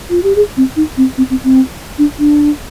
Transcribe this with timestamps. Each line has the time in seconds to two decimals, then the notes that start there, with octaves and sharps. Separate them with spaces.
0.10 F4
0.23 G4
0.36 G#4
0.57 C4
0.76 D#4
0.97 C4
1.18 C4
1.30 C4
1.44 C4
1.98 D4
2.19 D4